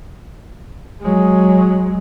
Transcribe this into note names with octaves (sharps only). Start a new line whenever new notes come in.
F#3 G#3